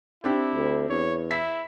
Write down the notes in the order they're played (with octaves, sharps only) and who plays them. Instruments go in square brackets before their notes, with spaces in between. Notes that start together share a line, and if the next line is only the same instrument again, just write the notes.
[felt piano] C4 D4 G4 [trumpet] E4
[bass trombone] D2
[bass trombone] E2 [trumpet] C#5
[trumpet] E4 [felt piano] E5 B6